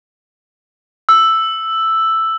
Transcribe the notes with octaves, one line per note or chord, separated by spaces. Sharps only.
E6